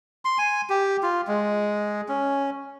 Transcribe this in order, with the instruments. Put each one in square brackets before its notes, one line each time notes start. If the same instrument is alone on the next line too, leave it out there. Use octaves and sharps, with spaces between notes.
[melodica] C6
G#5
G4
F4
G#3
C#4